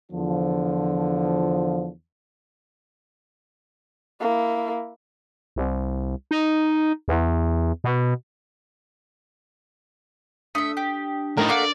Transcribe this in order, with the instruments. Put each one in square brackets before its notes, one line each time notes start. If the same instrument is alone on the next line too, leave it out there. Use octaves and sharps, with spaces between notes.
[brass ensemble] E2 D3 F3
[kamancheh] A#3 E4
[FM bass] C2
D#4
E2
B2
[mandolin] A3 E5 [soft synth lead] D4 [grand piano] D#6
[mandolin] G4
[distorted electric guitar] A2 D#4 [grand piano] A#4
[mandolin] A3 A#3 F#4 [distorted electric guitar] D5